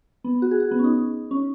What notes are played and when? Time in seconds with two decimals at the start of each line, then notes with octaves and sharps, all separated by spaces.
0.24 B3
0.42 F#4
0.51 G#4
0.60 F#4
0.71 B3
0.79 C#4
0.84 D#4
1.31 C#4